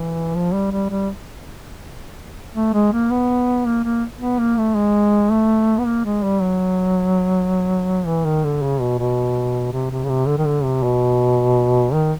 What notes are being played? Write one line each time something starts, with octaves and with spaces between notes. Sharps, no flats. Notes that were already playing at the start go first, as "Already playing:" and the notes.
Already playing: E3
F3
G3
G3
G3
A3
G#3
A#3
B3
A#3
A#3
B3
A#3
A3
G#3
A3
B3
A#3
G#3
G3
F#3
E3
D#3
D3
C#3
B2
B2
C3
C3
C#3
C3
D3
D#3
D3
C3
B2
D#3